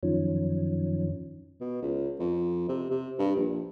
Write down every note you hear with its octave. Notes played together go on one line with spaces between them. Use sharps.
F#2 D#3 F3 C#4
B2
C#2
F2
C3
C3
G2
A#1